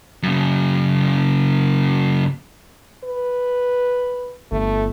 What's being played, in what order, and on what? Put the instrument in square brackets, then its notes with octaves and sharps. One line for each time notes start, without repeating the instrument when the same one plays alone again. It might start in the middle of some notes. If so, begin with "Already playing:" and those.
[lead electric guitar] F#2 C#3
[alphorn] B4
[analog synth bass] G1 [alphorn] A3